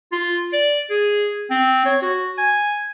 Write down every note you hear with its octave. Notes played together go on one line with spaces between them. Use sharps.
F4
D5
G#4
C4
C#5
F#4
G#5